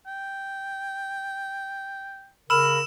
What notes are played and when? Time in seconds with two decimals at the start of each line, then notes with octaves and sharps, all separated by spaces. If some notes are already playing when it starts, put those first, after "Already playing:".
0.07 G5
2.50 C#3 A#4 B5 E6 F6 E7